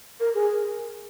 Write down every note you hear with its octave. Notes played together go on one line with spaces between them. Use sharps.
A#4
G#4